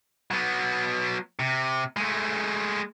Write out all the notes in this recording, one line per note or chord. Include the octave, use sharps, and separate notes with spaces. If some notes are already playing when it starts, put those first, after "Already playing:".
F#3 B3
C3
G#3 A3